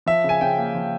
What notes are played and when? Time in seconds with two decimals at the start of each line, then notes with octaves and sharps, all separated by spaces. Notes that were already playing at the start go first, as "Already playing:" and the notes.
0.06 F3 E5
0.24 C#3 G#5
0.41 C#3 G5
0.58 A#3
0.75 F3